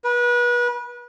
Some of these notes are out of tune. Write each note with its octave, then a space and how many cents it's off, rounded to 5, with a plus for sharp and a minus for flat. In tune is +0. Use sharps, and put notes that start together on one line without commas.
B4 -30